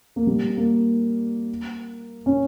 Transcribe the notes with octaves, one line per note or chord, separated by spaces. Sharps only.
A#3
G3
A#3
C#4